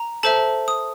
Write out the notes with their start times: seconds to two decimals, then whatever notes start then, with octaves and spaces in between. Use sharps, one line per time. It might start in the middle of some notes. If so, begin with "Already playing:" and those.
Already playing: A#5
0.23 A4 C5 E5 A5
0.68 D#6